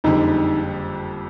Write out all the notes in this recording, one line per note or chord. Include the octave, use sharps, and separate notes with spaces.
F#1 F2 D3 G3 D#4